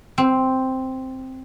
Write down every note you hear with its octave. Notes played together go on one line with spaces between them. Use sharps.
C4